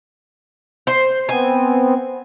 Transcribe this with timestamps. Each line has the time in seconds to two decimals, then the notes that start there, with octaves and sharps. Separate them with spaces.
0.87 C5
1.29 B3 C4 G#5